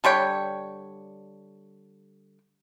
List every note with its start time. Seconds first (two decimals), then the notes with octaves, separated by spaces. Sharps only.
0.04 D3 G3 C#5 G5